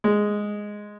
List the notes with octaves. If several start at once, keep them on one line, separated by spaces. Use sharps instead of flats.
G#3